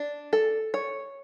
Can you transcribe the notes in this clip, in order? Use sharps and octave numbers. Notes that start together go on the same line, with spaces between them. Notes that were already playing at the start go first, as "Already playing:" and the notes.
Already playing: D4
A4
C#5